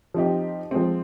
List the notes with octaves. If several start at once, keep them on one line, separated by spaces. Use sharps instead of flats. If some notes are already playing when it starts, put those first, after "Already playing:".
F3 C4 D#4 G4
F3 G#3 C4